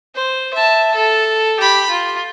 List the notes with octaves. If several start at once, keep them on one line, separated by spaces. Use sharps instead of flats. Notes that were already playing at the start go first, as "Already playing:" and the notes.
C5
E5 A5
A4
G4 B5
F4